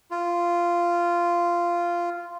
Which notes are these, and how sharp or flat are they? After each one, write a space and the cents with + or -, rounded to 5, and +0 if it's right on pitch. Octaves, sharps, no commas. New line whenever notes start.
F4 -10